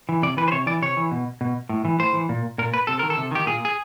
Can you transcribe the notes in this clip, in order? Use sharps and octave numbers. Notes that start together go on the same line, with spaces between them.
E3
C3 D5
E3 B4
C5
C3 C#5
E3 D5
C3 C#5
E3
B2
B2
A2
E3
A2 C5
E3
A#2
A#2 A#4
B4
C3 A4
D#3 A#4
A4
C3
D#3 G4
A#2 G#4
G#4